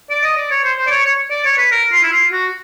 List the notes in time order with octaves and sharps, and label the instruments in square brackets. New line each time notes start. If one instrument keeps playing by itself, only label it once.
[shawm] D5
D#5
D5
C#5
C5
C5
D5
C#5
C#5
D5
C#5
B4
A#4
F4
E4
F4
F#4